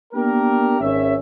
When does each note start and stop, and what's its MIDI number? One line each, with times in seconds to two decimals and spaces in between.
0.14 0.75 58
0.14 0.75 59
0.14 0.75 62
0.14 0.75 67
0.14 0.75 70
0.80 1.15 32
0.80 1.15 61
0.80 1.15 76